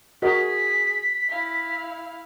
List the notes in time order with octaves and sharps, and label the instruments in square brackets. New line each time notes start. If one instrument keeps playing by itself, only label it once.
[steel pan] F#4 A#4 D#5 [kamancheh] G#4 [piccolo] B6
[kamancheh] E4 F5